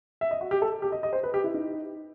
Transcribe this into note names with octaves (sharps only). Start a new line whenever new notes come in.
E5
D#5
F#4
G4
A4
G4
D#5
D#5
C5
B4
G4
E4
D#4